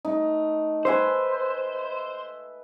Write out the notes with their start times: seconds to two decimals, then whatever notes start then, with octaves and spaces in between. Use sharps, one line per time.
0.05 A3 D#4
0.85 B4 C5 E5 G#5